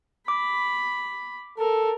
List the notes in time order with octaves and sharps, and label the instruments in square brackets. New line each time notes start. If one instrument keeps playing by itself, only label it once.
[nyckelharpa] B5 [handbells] D6
[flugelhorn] A4 [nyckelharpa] A#4